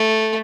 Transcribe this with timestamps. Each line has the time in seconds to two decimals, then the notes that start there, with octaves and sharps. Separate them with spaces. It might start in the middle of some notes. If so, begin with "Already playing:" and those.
Already playing: A3